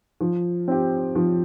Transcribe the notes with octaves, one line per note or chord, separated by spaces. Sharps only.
F3
C4 G4
F3